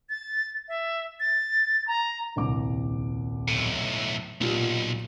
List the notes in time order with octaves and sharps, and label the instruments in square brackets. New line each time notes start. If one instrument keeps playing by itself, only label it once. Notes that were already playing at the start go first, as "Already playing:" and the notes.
[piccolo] A6
E5
A6
A#5
[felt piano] D#1 C2 D6
[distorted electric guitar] B1 A2
[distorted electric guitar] B1 [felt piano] A#2 F4 G4